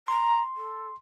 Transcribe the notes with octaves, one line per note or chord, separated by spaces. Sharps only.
A#5 C6
A4